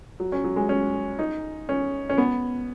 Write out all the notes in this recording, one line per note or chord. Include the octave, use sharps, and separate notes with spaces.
F#3
C#4
F#3
G#3
C#4
D#4
C#4
C#4
B3